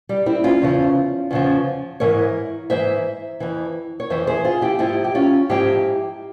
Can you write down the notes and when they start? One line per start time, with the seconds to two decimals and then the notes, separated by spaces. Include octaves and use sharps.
0.09 G3
0.26 C4 E4
0.44 C#4 F4
0.62 E2 C#3 F3
1.31 E2 C#3 F3
2.00 G#2 E3 A#4 C#5
2.70 G#2 E3 C5 E5
3.40 F2 E3
4.00 C#5
4.10 F2 E3 C5 E5
4.27 G#4 C5
4.45 F4 G#4
4.61 E4 G4
4.79 G#2 F3 E4 G4
5.04 G4
5.15 C#4 F4
5.50 G#2 F3 E4 G4